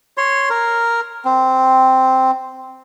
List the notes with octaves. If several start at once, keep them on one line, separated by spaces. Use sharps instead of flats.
C#5 C6
A#4
C4